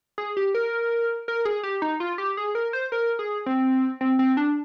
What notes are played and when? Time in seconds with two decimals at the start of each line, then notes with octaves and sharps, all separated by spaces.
0.18 G#4
0.37 G4
0.55 A#4
1.28 A#4
1.45 G#4
1.63 G4
1.82 D#4
2.00 F4
2.18 G4
2.37 G#4
2.55 A#4
2.73 C5
2.92 A#4
3.19 G#4
3.46 C4
4.01 C4
4.19 C4
4.37 D4